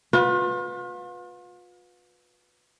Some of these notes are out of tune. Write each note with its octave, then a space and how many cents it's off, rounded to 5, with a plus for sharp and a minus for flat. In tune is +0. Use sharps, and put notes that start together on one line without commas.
F4 +40 B4 +0